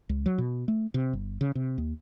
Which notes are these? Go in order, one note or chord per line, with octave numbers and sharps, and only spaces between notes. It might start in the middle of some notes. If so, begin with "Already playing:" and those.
C#2
F#3
B2
A3
C3
G1
C#3
C3
D#2